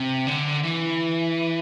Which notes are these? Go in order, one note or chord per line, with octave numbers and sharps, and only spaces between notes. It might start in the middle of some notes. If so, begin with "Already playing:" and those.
Already playing: C3
D3
E3